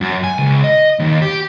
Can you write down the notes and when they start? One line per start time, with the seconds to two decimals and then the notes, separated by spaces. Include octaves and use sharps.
0.01 F#2
0.24 G#5
0.39 C#2
0.64 D#5
0.99 D#2
1.22 G4